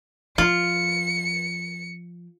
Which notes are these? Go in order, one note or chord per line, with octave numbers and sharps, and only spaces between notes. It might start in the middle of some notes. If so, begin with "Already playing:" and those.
F3 F4 C#7